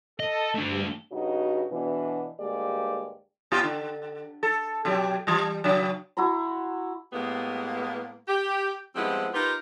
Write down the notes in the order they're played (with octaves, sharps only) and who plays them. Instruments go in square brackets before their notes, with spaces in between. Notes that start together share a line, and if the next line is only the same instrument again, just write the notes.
[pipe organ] A4 [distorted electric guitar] D#5
[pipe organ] G2 [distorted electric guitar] A3 D4
[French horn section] G2 C#3 D#4 F#4
B2 E3 D4
D2 G2 G#3 A#3 G4 D5
[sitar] A#2 F4 G4
D3
A4
B2 F#3 G4
E3 G3
C#3 F#3
[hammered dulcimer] E4 F#4 A#5 C6
[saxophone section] A2 G3 G#3 A#3 B3
G4
F3 G3 G#3 B3 C4 E4
D#4 F4 G4 A#4 B4